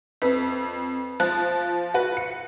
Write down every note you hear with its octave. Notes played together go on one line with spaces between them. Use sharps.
F2 B4
F3 F#6
F#4 B4
C#7